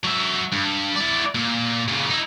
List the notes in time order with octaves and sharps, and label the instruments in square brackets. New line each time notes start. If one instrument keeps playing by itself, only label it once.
[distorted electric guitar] F#3 E5
G2
E4 D5
A#2
A#2 C#3
D#4 E4